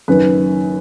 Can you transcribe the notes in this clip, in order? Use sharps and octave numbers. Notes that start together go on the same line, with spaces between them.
F#1 F#2 D#3 B4